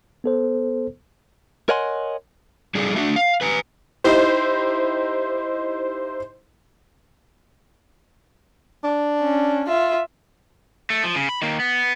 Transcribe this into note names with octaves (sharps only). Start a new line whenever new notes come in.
B3 A4 C5
A#4 C#5 D#5 F#5 G#5 C6
G3 D#4 G#4 A4 D5
A3 D4 F#4 E5
F5
B4 G#5 A#5
D#4 E4 G4 C5
D4
C#4
F4 E5
A3
F3
C#3
B5
D#3 A#3
B3